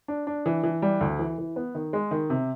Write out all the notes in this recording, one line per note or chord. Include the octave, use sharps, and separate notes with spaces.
D4
D4
E3
E3
G3
D2
E3
E3
B3
D#3
G#3
D#3
C3